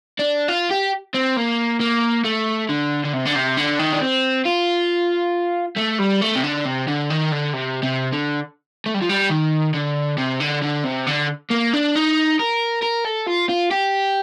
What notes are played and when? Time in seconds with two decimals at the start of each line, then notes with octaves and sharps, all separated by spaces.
0.19 D4
0.48 F4
0.70 G4
1.14 C4
1.37 A#3
1.80 A#3
2.25 A3
2.69 D3
3.04 D3
3.13 C3
3.25 D3
3.35 C3
3.57 D3
3.79 D#3
3.93 D4
4.01 C4
4.45 F4
5.77 A3
6.00 G3
6.22 A3
6.36 C3
6.44 D3
6.65 C3
6.88 D3
7.10 D#3
7.32 D3
7.53 C3
7.83 C3
8.13 D3
8.86 A3
8.94 G3
9.02 F3
9.10 G3
9.30 D#3
9.74 D3
10.18 C3
10.40 D3
10.63 D3
10.84 C3
11.07 D3
11.51 A#3
11.73 D4
11.96 D#4
12.39 A#4
12.83 A#4
13.05 A4
13.27 F4
13.49 F4
13.71 G4